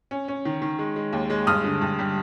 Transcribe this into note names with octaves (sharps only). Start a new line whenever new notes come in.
C#4
C#4
D#3
D#3
G#3
G#3
D#2
G#3
G2 D#6 F6
D3
G2
G3